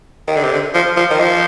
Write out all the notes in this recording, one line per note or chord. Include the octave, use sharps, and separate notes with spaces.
D#3
D3
C3
D3
F3
F3
D#3
F3